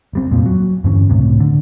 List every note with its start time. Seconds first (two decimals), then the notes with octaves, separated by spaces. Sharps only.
0.13 F#1 G3 C4
0.31 C2 F2 A#2 F3
0.46 F#3
0.84 G2 D3 E3 C#4
1.10 C#2 A2 C3
1.40 D3